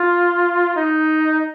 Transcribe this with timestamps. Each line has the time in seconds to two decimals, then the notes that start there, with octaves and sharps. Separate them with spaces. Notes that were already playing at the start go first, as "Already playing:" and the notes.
Already playing: F4
0.76 D#4